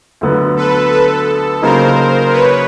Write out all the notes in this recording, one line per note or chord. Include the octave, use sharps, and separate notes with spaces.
D2 D3 F#3 B3
A4 B4
A4 B4
C#3 F#3 A#3 D#4 A#4 C5
B4 C#5